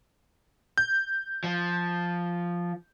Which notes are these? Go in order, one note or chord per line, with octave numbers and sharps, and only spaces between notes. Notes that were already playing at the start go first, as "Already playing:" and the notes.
G6
F3